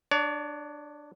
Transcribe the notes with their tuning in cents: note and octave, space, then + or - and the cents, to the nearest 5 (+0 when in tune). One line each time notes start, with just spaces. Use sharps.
D4 +15 C#5 +40